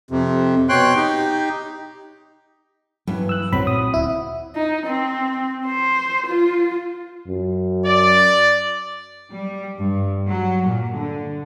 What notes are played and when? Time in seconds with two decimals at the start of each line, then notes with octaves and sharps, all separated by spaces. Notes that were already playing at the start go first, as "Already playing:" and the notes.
0.11 F2 C3
0.69 B2 C#5 G5 C6 F#6
0.96 D#4 G4
3.07 G2 E3 F#3 C#4
3.29 E6 F#6
3.53 B1 G2 B2 F#3 B3 C4 B5
3.67 A#2 D#6
3.94 D1 E4
4.55 D#4
4.86 C4
5.66 C5
6.26 F4
7.28 F#2
7.85 D5
9.31 G3
9.78 G2
10.28 F#3
10.67 A#2
10.96 D3